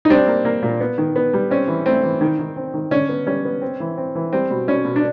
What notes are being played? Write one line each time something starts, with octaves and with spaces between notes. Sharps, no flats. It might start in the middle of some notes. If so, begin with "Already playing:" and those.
D#4
G3 C4 D4
A#3
A#3
A#2
B3
D#3
B3
G3
C4 C#4
E3
A3 C4
E3
D#3
D#3
C4
D#3
D3 C#4
B3
G3 C#4
B3
C4
E3
C4
E3
G3 C4
B2
B2 C#4
B2
D4